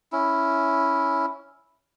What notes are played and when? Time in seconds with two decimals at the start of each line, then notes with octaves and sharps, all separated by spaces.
0.12 C#4 E4